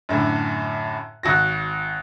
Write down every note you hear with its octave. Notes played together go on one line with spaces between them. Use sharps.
F#2 A2 D3
G#1 F#4 A#6